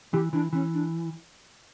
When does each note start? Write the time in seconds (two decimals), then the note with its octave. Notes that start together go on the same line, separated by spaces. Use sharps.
0.13 E3 G4
0.33 E3 D4
0.53 E3 C#4
0.74 D4